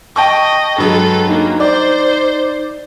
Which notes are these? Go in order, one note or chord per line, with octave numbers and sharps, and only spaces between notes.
D#5 G5 A5 C#6
G2 F#3 G#3 A4
A#3 D#4
C5 D5